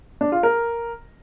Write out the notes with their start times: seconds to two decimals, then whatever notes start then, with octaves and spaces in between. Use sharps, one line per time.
0.21 D4
0.32 F4
0.43 A#4